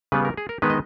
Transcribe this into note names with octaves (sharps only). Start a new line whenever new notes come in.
C#3 G3 B3 B4
A#4
G#4
A#4
D#3 G#3 B3 B4
D#5